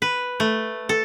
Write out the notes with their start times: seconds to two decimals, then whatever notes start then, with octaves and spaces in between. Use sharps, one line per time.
0.02 B4
0.40 A3
0.89 A4